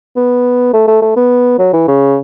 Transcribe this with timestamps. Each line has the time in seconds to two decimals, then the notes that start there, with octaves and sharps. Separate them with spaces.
0.16 B3
0.73 A3
0.88 A3
1.02 A3
1.16 B3
1.59 F#3
1.73 E3
1.88 C#3